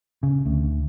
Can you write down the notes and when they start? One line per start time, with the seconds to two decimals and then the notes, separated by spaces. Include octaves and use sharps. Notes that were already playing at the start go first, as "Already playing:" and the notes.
0.23 C#3
0.45 D2